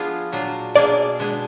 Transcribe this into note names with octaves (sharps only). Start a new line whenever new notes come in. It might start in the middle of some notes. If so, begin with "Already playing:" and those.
Already playing: F3 B3 D4 F4 G#4
A#2 F#3 D4 F4
B2 A#3 D4 G#4 D5
B2 G#3 D4 G#4